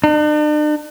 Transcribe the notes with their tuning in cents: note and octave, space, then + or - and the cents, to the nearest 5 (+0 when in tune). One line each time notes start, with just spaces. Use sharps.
D4 +45